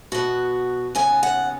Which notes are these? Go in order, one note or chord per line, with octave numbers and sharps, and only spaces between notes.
B2 B3 F#4
D#2 C#3 B3 G#5
F#5